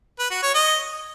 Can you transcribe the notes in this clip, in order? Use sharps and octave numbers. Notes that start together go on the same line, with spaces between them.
B4
F#4
C#5
D#5